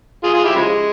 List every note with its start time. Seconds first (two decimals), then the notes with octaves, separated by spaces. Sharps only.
0.24 F4 G#4
0.34 F4 G#4
0.44 E4 G4
0.56 C#3 F3 G#3